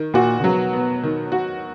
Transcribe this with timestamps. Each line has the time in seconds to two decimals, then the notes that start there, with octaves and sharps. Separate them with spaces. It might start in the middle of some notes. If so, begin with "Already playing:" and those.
Already playing: D#3
0.14 A#2 F#4
0.40 C#3
0.43 B2 F#3
0.73 B3
1.03 D#3
1.32 F#4